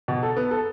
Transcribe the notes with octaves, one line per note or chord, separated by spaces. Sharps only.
B2
A4
B3
A4